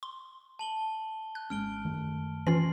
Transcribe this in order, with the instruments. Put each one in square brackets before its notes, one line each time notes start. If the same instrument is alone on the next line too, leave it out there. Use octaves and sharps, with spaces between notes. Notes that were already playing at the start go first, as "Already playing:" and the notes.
[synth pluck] C6
[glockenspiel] A5 F#7 G7
[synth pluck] F#6
[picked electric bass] G#1 G#3 C#4 [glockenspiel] F6 D7 G7
[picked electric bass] F#2 D#3 A3
[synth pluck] E3 C#4 F4 [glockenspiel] C6 C7